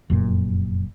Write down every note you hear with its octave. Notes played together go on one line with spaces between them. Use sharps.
F1 F#2 A#2